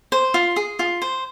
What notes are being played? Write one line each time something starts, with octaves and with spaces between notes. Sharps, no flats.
C5
F4
G#4
F4
C5